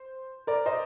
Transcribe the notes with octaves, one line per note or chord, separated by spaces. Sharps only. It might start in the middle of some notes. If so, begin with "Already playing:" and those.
Already playing: C5
A#4 D5
C5 D#5